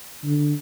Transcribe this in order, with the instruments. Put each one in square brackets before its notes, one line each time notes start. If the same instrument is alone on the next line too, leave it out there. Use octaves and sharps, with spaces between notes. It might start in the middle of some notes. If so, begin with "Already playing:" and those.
[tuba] D3